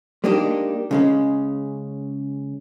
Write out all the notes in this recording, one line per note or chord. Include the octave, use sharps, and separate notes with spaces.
G#3 A#3 D4 D#4 G4
C#3 G#3 C#4